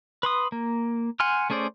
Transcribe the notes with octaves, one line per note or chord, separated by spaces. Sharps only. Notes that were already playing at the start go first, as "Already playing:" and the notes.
B4 C6 D#6
A#3
F#5 G#5 C6 F6
A3 C#4 G#4 C5 D5